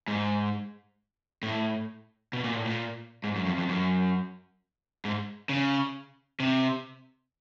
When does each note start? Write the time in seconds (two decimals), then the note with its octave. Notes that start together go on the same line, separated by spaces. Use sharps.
0.08 G#2
1.43 A2
2.33 B2
2.44 A#2
2.55 A2
2.65 A#2
3.24 G#2
3.36 F#2
3.46 F2
3.58 F2
3.69 F#2
5.05 G#2
5.49 C#3
6.40 C3